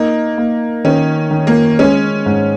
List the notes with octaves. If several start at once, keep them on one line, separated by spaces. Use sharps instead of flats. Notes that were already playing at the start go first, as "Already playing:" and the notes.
Already playing: A#3 D#4
A#3
D#3 C#4
D#3
A#3
G#3 C#4
G#2